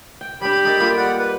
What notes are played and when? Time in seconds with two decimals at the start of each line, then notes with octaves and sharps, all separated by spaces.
0.21 G5
0.41 G3 D4 G4 B5
0.65 D#4 A4 A#4
0.80 G3 A#3 F4
0.97 D5 F#5
1.18 B4